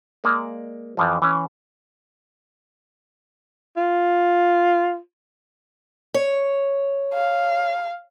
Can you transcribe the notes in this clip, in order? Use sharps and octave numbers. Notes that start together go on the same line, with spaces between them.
G#3 A#3 D5
F2 E3 F3
E3 C#4
F4
C#5
F5